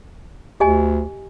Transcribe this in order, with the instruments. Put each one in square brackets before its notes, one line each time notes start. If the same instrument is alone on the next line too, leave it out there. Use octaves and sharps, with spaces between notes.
[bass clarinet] D2 [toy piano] G4 D#5 G#5